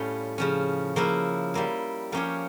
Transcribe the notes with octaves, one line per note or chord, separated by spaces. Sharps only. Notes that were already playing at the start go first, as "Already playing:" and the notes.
Already playing: A2 G3 A3 C#4 F4
C#3 F3 C#4
C#3 F3 A#3 E4
G3 A#3 E4
F3 A#3 C#4 G4 C#5